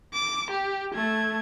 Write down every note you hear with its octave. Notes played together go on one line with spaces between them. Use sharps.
D6
G4
A3 G#6